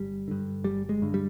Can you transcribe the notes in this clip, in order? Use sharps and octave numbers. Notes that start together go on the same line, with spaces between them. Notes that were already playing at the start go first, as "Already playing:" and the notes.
Already playing: G1 G3
G2 D3
G1 G3
G#3
G2 D3
G3